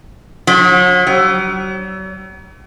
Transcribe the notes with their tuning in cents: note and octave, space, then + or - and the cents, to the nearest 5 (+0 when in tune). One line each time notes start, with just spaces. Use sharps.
F#3 -40
F#3 +45